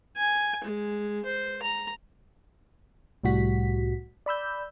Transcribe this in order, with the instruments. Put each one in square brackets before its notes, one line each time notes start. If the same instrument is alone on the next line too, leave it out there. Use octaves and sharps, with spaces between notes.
[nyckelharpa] G#5
G#3
C5
A#5
[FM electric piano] C2 A2 G3 F#4 B6
D5 B5 E6 G6